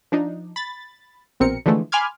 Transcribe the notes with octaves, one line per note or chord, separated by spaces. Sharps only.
F3 D4 D#4
B5 A6
A#1 B2 C4 A#4 C#7
D3 E3 F3 G#3 A3
G#5 B5 C6 D6 F6 G#6